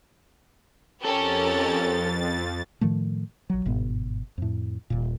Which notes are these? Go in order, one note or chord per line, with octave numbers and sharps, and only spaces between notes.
F2 C#4 G4 A4 A#4 A6
A2 D#3 F3 A3
A#1 F#3
G1 G#2 B2 B3
F2 A2
D#1 A#2